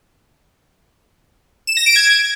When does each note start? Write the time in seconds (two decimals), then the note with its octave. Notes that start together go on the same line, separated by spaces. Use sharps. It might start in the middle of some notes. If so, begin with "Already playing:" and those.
1.67 E7
1.77 A#6
1.86 D7
1.96 G#6